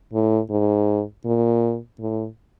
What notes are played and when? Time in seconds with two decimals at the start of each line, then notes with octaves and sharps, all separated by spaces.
0.13 A2
0.50 G#2
1.25 A#2
2.00 A2